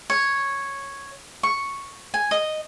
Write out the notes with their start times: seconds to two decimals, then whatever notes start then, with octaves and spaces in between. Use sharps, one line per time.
0.10 C#5
1.43 C#6
2.14 G#5
2.31 D#5